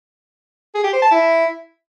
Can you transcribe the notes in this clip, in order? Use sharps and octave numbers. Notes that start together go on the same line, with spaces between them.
G#4
G4
C5
A5
E4